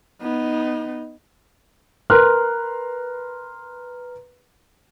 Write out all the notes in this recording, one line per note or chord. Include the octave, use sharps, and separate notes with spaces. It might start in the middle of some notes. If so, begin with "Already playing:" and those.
B3 D#4
A#4 B4 C6 F6 F#6